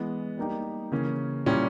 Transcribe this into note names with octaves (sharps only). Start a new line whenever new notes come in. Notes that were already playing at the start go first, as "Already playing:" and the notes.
Already playing: E3 G#3 B3
G3 A#3 D#4 G4
C#3 E3 A#3 C#4
A#2 G3 C#4 E4 G4